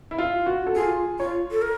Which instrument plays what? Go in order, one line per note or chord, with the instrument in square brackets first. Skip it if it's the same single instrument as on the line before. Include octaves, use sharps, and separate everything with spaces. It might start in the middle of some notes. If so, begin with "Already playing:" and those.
[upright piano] E4
F4
F#4
A4
[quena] F4 [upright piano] G#4
[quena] F4 [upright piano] C#5
[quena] A4
A#4